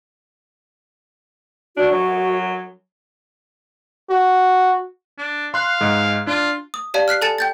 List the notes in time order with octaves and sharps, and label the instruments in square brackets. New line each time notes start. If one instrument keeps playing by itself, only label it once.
[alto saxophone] D4 [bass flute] F#4
[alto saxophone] F#3
[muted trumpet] F#4
[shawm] D4
[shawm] F5 [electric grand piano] C6 F#6
[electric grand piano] G#2 G#3
[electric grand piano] D4 [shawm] F4
[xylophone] D#6
G4 D5 F5 A5
F6 F#6 B6 C7
A4 G#5 A5 A6 C#7 E7
G5 G6 A6